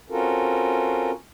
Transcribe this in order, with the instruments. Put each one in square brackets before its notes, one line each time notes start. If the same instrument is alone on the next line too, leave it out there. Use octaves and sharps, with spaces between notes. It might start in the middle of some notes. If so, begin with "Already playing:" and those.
[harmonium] C4 C#4 F4 F#4 A4 A#4